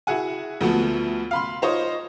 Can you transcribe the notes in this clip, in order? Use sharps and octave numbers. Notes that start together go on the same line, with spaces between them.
E4 F#4 G#4 F#5 G#5
D2 F3 F#3 A3 B3
F5 B5 C6
D#4 F4 C5 C#5 D#5